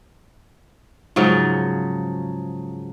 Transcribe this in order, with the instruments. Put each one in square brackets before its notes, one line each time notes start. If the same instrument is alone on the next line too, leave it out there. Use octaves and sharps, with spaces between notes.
[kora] G#2 C#3 F3 F#3